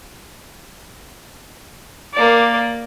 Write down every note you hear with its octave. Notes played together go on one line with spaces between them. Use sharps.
A#3 D5